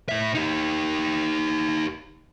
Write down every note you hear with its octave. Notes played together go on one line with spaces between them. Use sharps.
A2 E5
D#4 G4